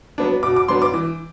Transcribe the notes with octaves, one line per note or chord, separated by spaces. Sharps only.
F#3 B3 D4
B2 D6
D6
F#3 B3 D4 C6
D6
E3